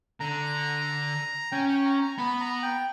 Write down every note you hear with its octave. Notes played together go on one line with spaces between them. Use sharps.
D3 A#5
C#4 G5
G5
A#5
A#5
B3 B5
A#5
G5